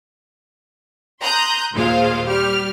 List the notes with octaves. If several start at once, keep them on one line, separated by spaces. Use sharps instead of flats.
A#5 C6 D#6 F#6 G6
D#2 A#2 G#3 F4 C5 F5
G3 G4 F6